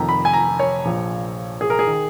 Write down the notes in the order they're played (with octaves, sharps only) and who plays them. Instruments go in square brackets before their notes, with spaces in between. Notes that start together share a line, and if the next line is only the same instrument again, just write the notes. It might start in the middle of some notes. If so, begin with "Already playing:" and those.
Already playing: [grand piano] F1 F2 D#3 A#5
B5
G#5
A#5
C#5
A#1 A#2 F3
G#4
A#4
G#4
D#3